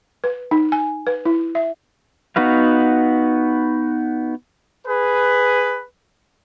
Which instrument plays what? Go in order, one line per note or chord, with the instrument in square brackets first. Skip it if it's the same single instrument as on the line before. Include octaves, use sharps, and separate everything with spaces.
[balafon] B4
D#4
G#5
B4
E4
E5
[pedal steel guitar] B3 D#4 F#4 B4 F5
[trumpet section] G#4 B4